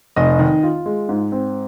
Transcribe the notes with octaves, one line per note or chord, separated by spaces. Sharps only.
F1 D#5
D#3
F4
G#3
G#2
C4